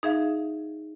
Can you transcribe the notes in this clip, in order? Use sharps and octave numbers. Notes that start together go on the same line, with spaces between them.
D#4 G#4 E5 F5